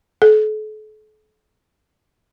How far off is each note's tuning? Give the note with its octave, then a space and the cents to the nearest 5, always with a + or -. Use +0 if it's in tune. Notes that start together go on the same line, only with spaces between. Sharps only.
A4 -40